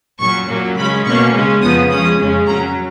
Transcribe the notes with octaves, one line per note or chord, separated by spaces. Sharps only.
A#2 F#3 C#4 C#6
A#2 F#3 A#3 C#4
C#3 G#3 C#4 B5
B2 A#3 C#4 C#6
C#3 G#3 C#4
F2 C#3 F3 B3 D#6
C#3 F3 G#3 C#4 D#6
F2 C#3 G#3 C#4
A#2 F#3 C#4 A#5